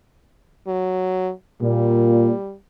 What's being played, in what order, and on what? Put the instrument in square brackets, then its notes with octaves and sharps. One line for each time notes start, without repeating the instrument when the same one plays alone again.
[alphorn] F#3
[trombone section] A#2 [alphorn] G3